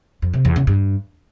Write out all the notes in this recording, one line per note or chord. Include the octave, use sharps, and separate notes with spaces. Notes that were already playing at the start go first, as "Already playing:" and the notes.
F2
C3
E2
C#3
G2